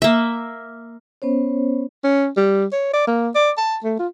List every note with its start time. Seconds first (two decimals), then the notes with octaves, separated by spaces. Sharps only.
0.02 A#3 E5
1.22 B3 C#4 C5 C#5
2.04 C#4
2.37 G3
2.73 C#5
2.93 D5
3.07 A#3
3.35 D5
3.57 A5
3.83 A3
3.99 F4